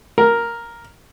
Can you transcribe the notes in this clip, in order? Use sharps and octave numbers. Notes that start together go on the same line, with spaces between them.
A#4